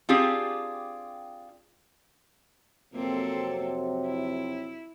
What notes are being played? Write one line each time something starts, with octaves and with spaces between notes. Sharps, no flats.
C4 D4 F4 G4 G#4
F2 C3 F#3 A#3 C4 A4
E4